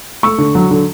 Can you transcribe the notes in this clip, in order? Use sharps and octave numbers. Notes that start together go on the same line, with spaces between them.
A3 C#6 E6
D3
F#3
D3